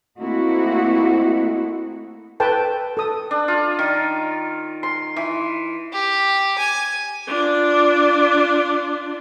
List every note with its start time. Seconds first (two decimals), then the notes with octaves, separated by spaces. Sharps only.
0.19 A3 A#3 C4 D#4 E4 F#4
2.40 A4 B4 G5 A5
2.97 A4 D#6
3.31 D4
3.48 F4
3.79 D#3
4.83 C6
5.16 E3
5.94 G4
6.59 G#5
7.27 D4 F4